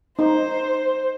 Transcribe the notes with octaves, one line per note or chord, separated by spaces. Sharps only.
D#4 C5